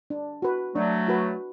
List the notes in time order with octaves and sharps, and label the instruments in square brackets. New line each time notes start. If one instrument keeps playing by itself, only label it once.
[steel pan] D4
F#4 B4
[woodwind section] F#3 A3 [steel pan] D4
[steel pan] F#4 B4